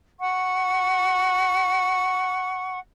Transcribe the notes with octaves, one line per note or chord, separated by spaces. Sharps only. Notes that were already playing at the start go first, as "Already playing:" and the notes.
F#5 C#6